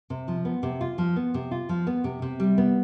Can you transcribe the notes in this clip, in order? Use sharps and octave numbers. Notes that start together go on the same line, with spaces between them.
C3
F3
B3
C3
F4
F3
B3
C3
F4
F3
B3
C3
C3
G3
B3